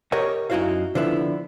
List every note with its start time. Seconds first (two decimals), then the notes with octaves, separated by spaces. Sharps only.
0.12 G4 A#4 C#5 D#5 F#5
0.50 F#2 D#4 E4 F#4 C5 F5
0.95 D3 F3 B3 E4